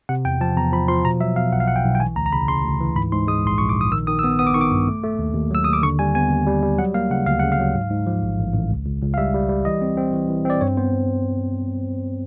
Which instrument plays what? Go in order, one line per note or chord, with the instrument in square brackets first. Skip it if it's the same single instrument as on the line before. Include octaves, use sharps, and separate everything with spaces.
[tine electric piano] C3 F#5
E2 G5
F3 A5
E2 A#5
F3 B5
F3 C6
B2 A#5
F#3 E5
B2 F5
B1 F#5
F5
B1 F#5
G5
B1
G5
E3 G#5
D2 A#5
A#5
C#3 B5
C#3 C6
D2
E3
G#2 B5
G#2 C6
G#3 D#6
A#1 C6
A#1 C#6
D6
A#1
D#6
D#3 E6
D#3 D#6
E6
B3 D#6
B3 D#6
D6
D#3 C#6
D6
G2
A3
A3
D#2
D#2
F#3 E6
D#2 D#6
D6
D3 C#6
G3 G#5
B3 G#5
D#2
G3
G3
F#3 F#5
A#3 F5
C#3 F#5
D2 F5
C#3 F#5
F5
F#3
G#2
G#2
F3
A1
A1
A1
C#2
C#2
C#2
F5
G3 E5
G3
G3
E3 D#5
C4
C4
E3
E3
C4 D5
G2 C#5
B3 C5